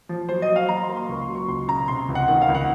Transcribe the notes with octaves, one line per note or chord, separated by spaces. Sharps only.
F3
F#3 C5
D#5
F#3
F5
F#3 A#5
C6
A#3
C6
C#2 C#6
C6
F#3
C#6
C#2 C6
C#3 A#5
C3 C6
C#2
F#5
D#3 F#5
F5
C#2
F#5